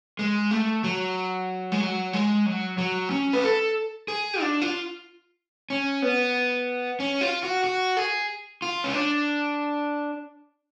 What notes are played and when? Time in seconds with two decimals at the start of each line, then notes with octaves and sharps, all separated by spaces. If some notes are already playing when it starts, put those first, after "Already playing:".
0.19 G#3
0.51 A3
0.84 F#3
1.72 G#3
1.81 F#3
2.13 G#3
2.46 F#3
2.78 F#3
3.11 C#4
3.33 B4
3.44 A4
4.08 G#4
4.41 D4
4.61 F4
5.70 C#4
6.02 B3
7.00 C#4
7.21 F4
7.43 F#4
7.64 F#4
7.97 G#4
8.62 F4
8.84 C#4
8.94 D4